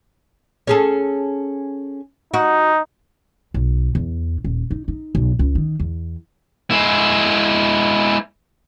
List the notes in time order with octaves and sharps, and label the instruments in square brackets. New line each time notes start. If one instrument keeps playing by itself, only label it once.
[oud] C#4 G#4 A4
[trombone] D#4 [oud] F#4
[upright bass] B1
E2
D#1
D#4
D#4
B1
C#2
D#3
E2
[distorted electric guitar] G#3 E4